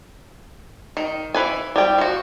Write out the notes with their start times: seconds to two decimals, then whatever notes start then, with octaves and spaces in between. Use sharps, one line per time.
0.97 D#3
1.34 E3 B4 G#5
1.76 G3 G5
1.98 F3 F#4